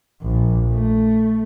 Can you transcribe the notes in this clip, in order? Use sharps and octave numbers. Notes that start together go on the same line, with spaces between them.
A#1
A3